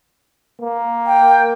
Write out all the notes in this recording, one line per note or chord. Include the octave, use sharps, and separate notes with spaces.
A#3
G5